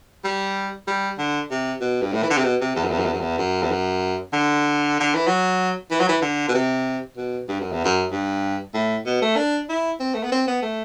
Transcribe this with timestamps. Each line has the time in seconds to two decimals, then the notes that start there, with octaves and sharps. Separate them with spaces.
0.24 G3
0.87 G3
1.18 D3
1.51 C3
1.81 B2
2.02 G2
2.13 A2
2.23 E3
2.30 D3
2.38 C3
2.44 B2
2.61 C3
2.76 E2
2.84 F#2
2.90 E2
2.99 F#2
3.05 E2
3.13 F#2
3.20 E2
3.38 F#2
3.63 E2
3.71 F#2
4.33 D3
5.00 D3
5.14 E3
5.27 F#3
5.91 E3
6.00 F#3
6.09 E3
6.22 D3
6.48 B2
6.54 C3
7.17 B2
7.48 G2
7.61 F#2
7.72 E2
7.85 F#2
8.11 G2
8.74 A2
9.06 B2
9.22 A3
9.36 D4
9.69 E4
10.00 C4
10.14 A3
10.23 B3
10.32 C4
10.47 B3
10.62 A3